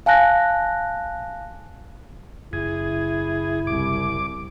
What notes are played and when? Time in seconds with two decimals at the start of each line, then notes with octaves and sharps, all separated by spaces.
0.06 F5 G#5 A5 F#6 A#6
2.53 F#1 E4 G#4
3.67 C2 D6